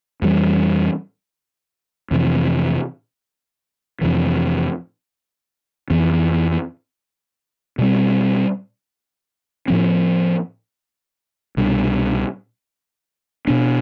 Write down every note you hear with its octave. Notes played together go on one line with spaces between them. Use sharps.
F2 E3 G3
F2 C3 E3
F2 C3 E3
F2 E3 B3
B2 G3 C4
A2 F3 C4
C2 B2 G3 D4
B2 B3 D4